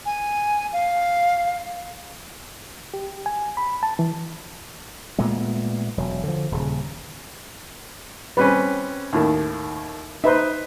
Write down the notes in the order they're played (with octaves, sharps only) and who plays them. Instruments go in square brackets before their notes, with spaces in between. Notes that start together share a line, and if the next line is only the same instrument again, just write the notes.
[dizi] G#5
F5
[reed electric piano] G4
G#5
B5
A5
E3
[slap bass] A#2 G#3 A3 B3
E1 F#3
D3 F3
D#1 C#3
[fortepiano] G3 C4 C#4 [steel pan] B4
[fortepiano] D#2 A2 D#3
[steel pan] D#4 B4 [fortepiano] C5 E5